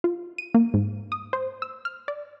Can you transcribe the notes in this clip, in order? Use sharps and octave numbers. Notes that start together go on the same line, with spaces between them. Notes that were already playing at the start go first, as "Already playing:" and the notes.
F4
D#7
A#3
G#2
D#6
C5
E6
F6
D5